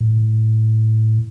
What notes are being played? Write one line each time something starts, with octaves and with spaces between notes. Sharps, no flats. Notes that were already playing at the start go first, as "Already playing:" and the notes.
A2